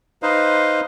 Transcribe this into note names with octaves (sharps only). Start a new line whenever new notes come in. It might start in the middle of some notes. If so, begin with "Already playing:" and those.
D#4 B4 C5 D#5 F5